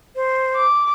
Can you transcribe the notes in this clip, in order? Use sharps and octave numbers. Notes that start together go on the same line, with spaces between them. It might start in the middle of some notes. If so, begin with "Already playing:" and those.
C5
D6